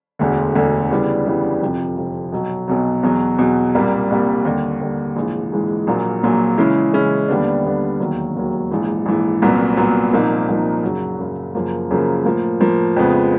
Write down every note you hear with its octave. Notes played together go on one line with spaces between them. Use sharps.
E1 D2 D3
E1 D2 D3
C#3 E3 G3 B3 D4
C#3 E3 G3 B3 D4
F2 C3 F3
F2 C3 F3
B1 B2 F#3
B1 B2 F#3
E2 B2 F#3
E2 B2 F#3
C2 A#2 G3 A#3
C2 A#2 G3 A#3
D#2 D3 G3
D#2 D3 G3
A#1 G#2 E3 G#3
A#1 G#2 E3 G#3
A#1 A#2 F#3 A#3
A#1 A#2 F#3 A#3
C#3 E3 G#3 C#4 E4
C#3 E3 G#3 C#4 E4
D#2 D3 G3 B3 D4
D#2 D3 G3 B3 D4
E1 D#2 D#3 F#3
E1 D#2 D#3 F#3
A#1 G#2 E3
A#1 G#2 E3
C2 A#2 F#3 B3
C2 A#2 F#3 B3
C2 A#2 F3 A#3 D#4
C2 A#2 F3 A#3 D#4
F#2 C#3 F#3
F#2 C#3 F#3
F#2 C#3 F3 A#3
F#2 C#3 F3 A#3
A2 F3 A#3
A2 F3 A#3
F2 C#3 F3 G#3 B3